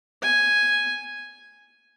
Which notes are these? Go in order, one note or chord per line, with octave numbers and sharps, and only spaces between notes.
G#5